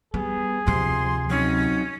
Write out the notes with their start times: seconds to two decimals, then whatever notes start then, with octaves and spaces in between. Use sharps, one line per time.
0.14 G3 B3 G#4
0.67 D2 C3 F3 C6
1.30 F#3 C4 C#4 D#4